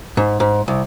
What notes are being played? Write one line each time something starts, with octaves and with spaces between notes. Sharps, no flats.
G#2
G#2
C2